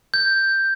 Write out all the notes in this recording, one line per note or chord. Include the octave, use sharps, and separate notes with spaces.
G6